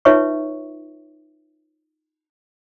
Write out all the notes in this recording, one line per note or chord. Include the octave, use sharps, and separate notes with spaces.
D#4 F4 B4 C#5 E5 C#6